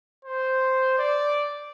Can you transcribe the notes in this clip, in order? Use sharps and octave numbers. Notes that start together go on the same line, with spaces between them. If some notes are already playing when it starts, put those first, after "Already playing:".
C5
D5